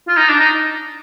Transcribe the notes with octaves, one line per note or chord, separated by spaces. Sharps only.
F4
D#4
D4
D#4